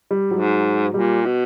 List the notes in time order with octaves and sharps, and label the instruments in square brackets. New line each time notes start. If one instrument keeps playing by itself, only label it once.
[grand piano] G3
[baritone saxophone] G#2 [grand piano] F#3
[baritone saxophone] A#2 [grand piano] G3
[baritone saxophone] B2